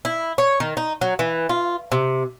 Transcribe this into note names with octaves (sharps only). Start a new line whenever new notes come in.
E4
C#5
D#3
D#4
F#3
E3
F4
C3